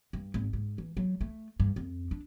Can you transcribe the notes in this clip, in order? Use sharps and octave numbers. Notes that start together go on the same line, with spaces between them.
G2
G#1
G#2
E3
F#3
A3
G2
F2
D4